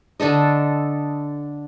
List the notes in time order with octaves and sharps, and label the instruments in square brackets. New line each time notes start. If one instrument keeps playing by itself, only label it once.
[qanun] D3 D4 A4 D#5